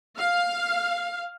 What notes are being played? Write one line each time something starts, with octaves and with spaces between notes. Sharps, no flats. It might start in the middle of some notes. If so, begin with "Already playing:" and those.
F5